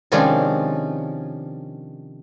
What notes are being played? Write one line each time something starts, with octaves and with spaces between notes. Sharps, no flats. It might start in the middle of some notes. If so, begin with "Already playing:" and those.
C3 D#3 F3 G#3 C#4 D4